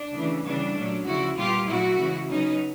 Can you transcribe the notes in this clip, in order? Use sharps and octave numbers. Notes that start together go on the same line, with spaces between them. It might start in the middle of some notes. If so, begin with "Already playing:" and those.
Already playing: D4
C#3 E3 A3
C#3 E3 G3 B3 D4
A#2 F#3 A3 C#4
D2 C#3 F3 E4 F#4
A#2 G3 B3 F4 G4
A#2 F#3 A3 E4 F#4
C#3 E3 G#3
C#3 F#3 B3 C#4 D#4